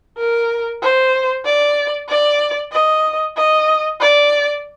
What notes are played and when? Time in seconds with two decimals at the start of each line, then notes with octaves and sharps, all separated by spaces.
0.18 A#4
0.82 C5
1.45 D5
2.09 D5
2.73 D#5
3.37 D#5
4.00 D5